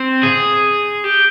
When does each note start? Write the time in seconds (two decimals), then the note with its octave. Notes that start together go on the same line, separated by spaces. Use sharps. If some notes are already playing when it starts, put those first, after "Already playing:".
Already playing: C4
0.23 G#4
1.04 G4